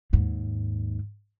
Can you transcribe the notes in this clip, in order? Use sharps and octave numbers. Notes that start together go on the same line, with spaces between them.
D#2 G#2